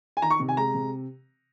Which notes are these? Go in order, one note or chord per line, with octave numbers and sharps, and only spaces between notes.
G#5
D#3 A#5
C#6
C3
G#5
G#3 A#5
C3